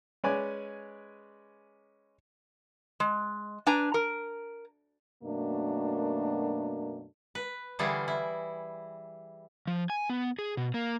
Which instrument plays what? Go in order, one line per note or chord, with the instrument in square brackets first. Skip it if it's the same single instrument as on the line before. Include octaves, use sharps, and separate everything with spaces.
[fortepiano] G#3 C#4 B4 C#5 D5 G#5
[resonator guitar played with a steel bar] G#3
D4 B4 G#5 A#5
A#4
[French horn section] F#2 B2 A3 A#3 D4
[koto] B4
D3 E3 G3 E4 F4 G#4
E4
[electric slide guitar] F3
G#5
B3
G#4
B2
A#3